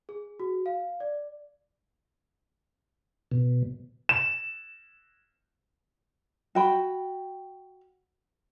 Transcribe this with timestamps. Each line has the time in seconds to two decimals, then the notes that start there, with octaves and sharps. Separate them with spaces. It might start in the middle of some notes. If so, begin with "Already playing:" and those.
0.09 G#4
0.40 F#4
0.66 F5
1.00 D5
3.32 B2
4.09 E7
6.55 F#4 G5 B5